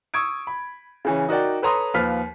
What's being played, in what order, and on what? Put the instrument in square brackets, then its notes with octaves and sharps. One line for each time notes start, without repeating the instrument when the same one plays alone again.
[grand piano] C#6 D#6 E6 G#6 D7
B5
C#3 E3 C#4
D#4 F#4 A#4 D5 G5
A4 B4 C#5 A#5 C6 D#6
D#2 F3 B4 F6 B6